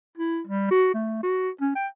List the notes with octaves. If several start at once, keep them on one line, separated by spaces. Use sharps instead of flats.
E4
G3
F#4
A3
F#4
C#4
G5